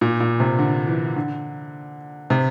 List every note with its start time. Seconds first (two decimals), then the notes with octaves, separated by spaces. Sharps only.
0.01 A#2
0.20 A#2
0.40 C3
0.59 D3
0.87 E3
1.16 D3
2.30 C3